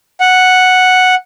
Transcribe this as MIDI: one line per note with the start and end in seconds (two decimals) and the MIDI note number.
0.20 1.15 78